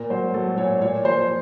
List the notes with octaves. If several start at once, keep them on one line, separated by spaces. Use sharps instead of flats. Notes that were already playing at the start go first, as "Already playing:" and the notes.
Already playing: A#2 A#4
F#3 C5
F#3 A4
A#2 C#5
A#2 C#5
F3 C5